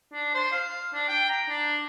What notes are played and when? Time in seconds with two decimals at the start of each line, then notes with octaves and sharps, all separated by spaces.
0.13 D4
0.35 C5
0.52 F5
0.94 D4
1.09 G5
1.29 A#5
1.49 D4